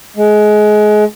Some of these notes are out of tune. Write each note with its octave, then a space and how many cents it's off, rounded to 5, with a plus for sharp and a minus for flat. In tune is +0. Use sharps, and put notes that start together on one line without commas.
G#3 +25